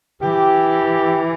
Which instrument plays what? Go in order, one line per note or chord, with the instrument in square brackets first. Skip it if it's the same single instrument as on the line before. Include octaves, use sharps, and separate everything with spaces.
[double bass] E3 [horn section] G4